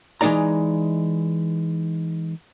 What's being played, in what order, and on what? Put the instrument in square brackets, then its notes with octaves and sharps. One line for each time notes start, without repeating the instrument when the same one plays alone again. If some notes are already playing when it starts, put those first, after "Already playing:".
[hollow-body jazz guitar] E3 G#3 D4 D#4 D5 A#5